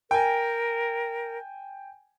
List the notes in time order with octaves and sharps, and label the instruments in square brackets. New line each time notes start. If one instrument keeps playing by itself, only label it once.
[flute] A#4 [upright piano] G5 G#5